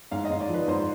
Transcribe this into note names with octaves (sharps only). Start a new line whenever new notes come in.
G#2 F5
D#5
G#2
D5
F3
B4
G#2 C5